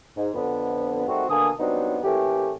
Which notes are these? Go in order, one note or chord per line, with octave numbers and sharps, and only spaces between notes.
G#2
F2 D3 B3
D#3 G3 A3 C4 F#4
B2 D3 A#3 G#5 A5 D#6
G2 F#3 B3 C4 D4 D#4
A2 E3 A3 A#3 C#4 G4